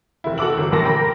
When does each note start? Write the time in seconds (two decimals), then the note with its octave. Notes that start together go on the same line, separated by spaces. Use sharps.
0.24 F1 E4
0.38 F#4 A4 D6 E6 F#7
0.58 G1
0.72 A#1 F#2 A#4 A5 C6 A#6
0.85 G5 B5
0.99 A#4